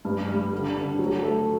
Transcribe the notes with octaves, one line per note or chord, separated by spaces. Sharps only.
G2
G3
D3
D3
F#3
A3